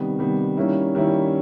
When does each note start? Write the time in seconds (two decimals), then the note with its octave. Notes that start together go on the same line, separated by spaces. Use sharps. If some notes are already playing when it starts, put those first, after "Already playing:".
Already playing: C3 D#3 G3 B3
0.19 C3 D#3 G3 B3
0.57 D#3 G3 A#3 C#4 E4
0.95 D#3 G3 A#3 C#4 E4